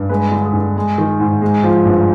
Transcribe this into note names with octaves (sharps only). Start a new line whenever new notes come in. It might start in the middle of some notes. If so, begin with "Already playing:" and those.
Already playing: G2
G#3 B4
D3
G#4
G2
G#3
D#3
G#2
G#3
F3
G2